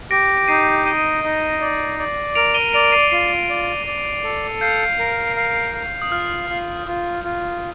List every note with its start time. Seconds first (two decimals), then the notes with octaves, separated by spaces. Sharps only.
0.11 G4 A#6 D7
0.37 D7
0.48 D#4 C7 D#7
0.85 D#5 C7 D#7
1.24 D#4
1.61 D5
1.99 D5
2.35 A#4 D7 F7
2.54 D#7 G7
2.73 D5 D7 F7
2.86 D7
2.92 C7 D#7
3.11 F4 C7 D#7
3.49 D5
3.86 D5
4.24 A4
4.61 F5 G6
4.99 A#4
5.36 F5
5.74 F5
6.02 D#6
6.11 F4 F6
6.50 F4
6.87 F4 D#6
7.24 F4